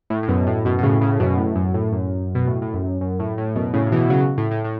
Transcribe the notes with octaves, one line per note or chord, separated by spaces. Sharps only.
A2
A2
F#2 B2
A2
F#2 B2
B2
A2 C#3
A2 C#3
F#2 B2
A2
F#2
A2
F#2
B2
A2
A2
F#2
F#2
A2
A2
F#2 B2
A2 C#3
C#3
B2 E3
C#3 F#3
A2
A2
A2